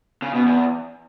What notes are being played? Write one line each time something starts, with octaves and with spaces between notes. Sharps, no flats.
C#3
B2
E2